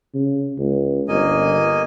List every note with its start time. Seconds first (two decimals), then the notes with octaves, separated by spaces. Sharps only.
0.14 C#3
0.58 C#2
1.08 G1 A#3 D#5 G#5